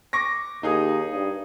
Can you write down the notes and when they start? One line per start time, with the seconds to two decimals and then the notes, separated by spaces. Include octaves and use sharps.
0.13 C#6 D6 A#6
0.63 D#2 D#4 G#4 D#6
1.12 G2